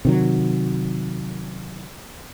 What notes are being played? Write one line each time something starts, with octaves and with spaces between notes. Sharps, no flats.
C3 D#3 F#3